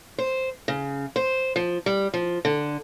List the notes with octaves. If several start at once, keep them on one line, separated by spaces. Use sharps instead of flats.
C5
C#3
C5
F3
G3
F3
D3